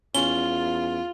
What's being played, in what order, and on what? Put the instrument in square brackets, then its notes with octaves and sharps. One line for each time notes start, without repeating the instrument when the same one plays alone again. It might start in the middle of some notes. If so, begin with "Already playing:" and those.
[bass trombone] E2 [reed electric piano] C#4 [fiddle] F4 [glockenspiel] G7